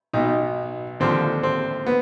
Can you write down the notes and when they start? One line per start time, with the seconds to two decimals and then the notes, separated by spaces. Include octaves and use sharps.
0.13 B1 B2 D#4
1.00 D#2 D3 F3 C4
1.43 C4
1.86 B3